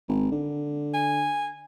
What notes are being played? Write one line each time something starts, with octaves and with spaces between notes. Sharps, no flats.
G#1
D3
G#5